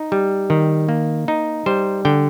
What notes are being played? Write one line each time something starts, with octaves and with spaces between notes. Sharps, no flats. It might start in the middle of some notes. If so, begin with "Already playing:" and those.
Already playing: D#4
G3
D#3
A#3
D#4
G3 C5
D3 G5